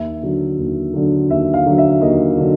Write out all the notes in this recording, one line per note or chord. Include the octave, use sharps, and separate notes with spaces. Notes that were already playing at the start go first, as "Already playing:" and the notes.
Already playing: D#2 E5
D3 F#3
D#2
D3 F#3
D#2 E5
F5
D3 F#3
E5
D#2 D#5
D3 F#3